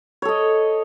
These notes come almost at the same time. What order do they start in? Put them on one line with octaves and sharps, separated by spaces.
C#5 A4 D#5